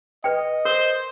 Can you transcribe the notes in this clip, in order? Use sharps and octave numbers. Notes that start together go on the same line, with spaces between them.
B4 D#5 G5
A#4 C5